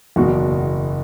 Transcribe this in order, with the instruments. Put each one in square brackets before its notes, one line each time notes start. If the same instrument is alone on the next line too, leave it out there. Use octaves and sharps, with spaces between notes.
[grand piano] F#1 E2 B2 F#4